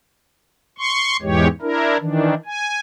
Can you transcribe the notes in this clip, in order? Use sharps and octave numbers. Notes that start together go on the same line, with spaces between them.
C6 C#6
E2 G#2 E3 G#3 G4 C#5
D4 E4 A#4
D#3 E3 D4
G#5